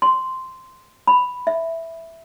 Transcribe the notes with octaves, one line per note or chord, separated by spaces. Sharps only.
C6
B5
E5